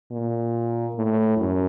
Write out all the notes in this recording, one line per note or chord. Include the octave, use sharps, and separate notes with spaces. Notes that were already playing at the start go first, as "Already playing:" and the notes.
A#2
A2
F#2